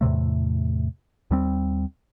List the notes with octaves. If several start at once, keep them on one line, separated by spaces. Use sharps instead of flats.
E2 A2 C3 A3
D#2 G3 C4